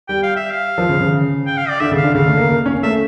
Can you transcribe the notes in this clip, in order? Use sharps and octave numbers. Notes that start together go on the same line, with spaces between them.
G3 G5
F5
E5
F5
F3
C#3
C#3
G5
F5
D5
D3 E5
C#3
F5
D3
C#3 F5
A3
A#3
A#3
C#4
A3 E5